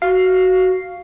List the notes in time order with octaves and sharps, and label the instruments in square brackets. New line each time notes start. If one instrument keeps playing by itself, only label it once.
[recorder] F#4 [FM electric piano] F5 C7